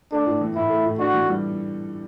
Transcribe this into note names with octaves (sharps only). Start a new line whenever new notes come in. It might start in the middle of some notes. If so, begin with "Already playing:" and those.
A3 D4
A2
E3
A2 E4
A3
A2
D4 F#4
E3
G3